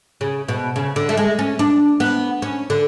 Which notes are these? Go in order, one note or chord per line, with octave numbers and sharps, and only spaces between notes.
C#3
B2
C#3
D3
A3
G#3
C#4
D4
B3
C#4
D3